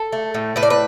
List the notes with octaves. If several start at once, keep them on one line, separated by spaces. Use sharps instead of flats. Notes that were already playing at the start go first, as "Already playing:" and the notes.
Already playing: A4
A3
A2
A2 B4
D5
B4